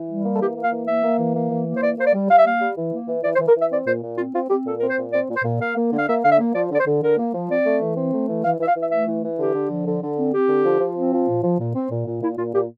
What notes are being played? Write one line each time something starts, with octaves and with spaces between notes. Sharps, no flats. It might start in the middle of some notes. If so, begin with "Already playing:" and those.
Already playing: E3
G3
A#3
A4
E3 G4
A#3
F5
E3
A#3 E5
A#3
E3
A#3
E3
A#3
C5
E3 D5
A#3 C5
D5
G3
G3 F5
E5
A#3 F5
G3
E3
A#3
E3
E3 D5
C5
E3
A#4
E3 E5
C4 D5
A#2 C5
A#2
C4 F4
C4 F4
C4 G4
A#2 A4
C4 A#4
C5
A#2
C4 D5
A#2
C5
A#2
A#3 F5
A#3
D3
F5
A#3 E5
D3 F5
E5
A#3
F3 D5
D3 D5
C5
D3
D3 A#4
A#3
F3
C4 D5
A3
E3
C4
A3
E3
E3 F5
E3 E5
F5
E3 E5
A3 E5
E3
E3
D3 G4
D3
F3
D3
D3
C4
C4 G4
D3
F3
F3
C4
F3
A#2
F3
A#2
C4
A#2
A#2
A#2 E4
A#2 F4
A#2 G4